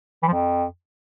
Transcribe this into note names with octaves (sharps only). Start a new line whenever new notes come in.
E3
F3
F2